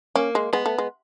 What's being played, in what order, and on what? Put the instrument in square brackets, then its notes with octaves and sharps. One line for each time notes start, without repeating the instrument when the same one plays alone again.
[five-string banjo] A#3 [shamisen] C#4
[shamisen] G#3
[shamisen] G#3 [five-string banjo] B3
[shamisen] A3
G#3